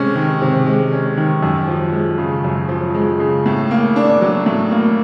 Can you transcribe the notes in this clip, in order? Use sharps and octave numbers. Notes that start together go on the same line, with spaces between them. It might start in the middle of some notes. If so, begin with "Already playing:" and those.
Already playing: C3 G#3 C#4
D#3
C3
G#3
C#4
D#3
F#2
F3
G#3
C#3
F#2
F3
G#3
C#3
A2
A#3
D4
F#3
A2
A#3